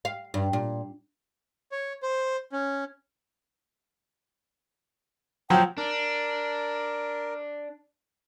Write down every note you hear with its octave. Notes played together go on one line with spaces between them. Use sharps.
F5
G2
A#2
C#5
C5
C#4
F3 F#3 G5
D4 A#4